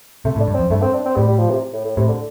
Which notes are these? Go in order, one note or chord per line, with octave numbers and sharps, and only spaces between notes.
C3 A3
A2
D4
G2
F2 C4
G2 A3
C4
D4
C4
A2 G3
G3
F3
C3
A2
A2
A2 C3
D3